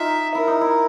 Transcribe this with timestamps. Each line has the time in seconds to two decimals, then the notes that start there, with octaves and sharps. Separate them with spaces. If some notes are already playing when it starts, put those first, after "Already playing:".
Already playing: D#4 F4 E5
0.35 E4 A#4
0.48 D#4
0.61 E4